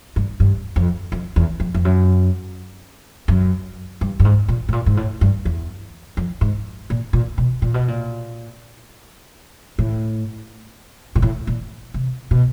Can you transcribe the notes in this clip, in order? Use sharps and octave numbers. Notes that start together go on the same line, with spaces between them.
G2
G2
F2
F2
E2
F2
F2
F#2
F#2
G2
G2
G#2
A#2
A2
A#2
G#2
A2
G2
E2
F2
G#2
A#2
A#2
B2
A#2
B2
A#2
A2
A#2
A2
A#2
C3
B2